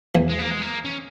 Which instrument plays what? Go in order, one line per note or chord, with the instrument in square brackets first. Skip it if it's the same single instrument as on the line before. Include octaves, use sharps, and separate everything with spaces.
[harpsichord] E2 E3
[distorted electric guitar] G#3
A#3
G#3
A#3
C#4